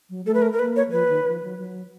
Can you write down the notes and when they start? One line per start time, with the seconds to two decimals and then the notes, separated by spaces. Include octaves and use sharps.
0.10 F#3
0.25 A3 A4
0.34 B4
0.42 A#4
0.52 A#4
0.59 A#3 B4
0.76 C#5
0.88 F#3
0.92 F3 B4
1.09 D#3
1.26 F3
1.43 F#3
1.59 F#3